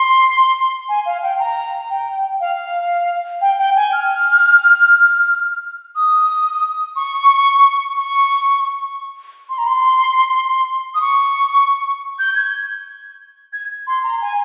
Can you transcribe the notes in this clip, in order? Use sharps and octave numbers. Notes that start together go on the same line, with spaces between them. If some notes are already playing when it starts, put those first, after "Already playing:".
Already playing: C6
G#5
F5
G5
A#5
G5
F5
G5
G5
G#5
F6
D#6
C#6
C#6
C6
A#5
C6
D#6
C#6
G6
G#6
G#6
C6
A#5
G#5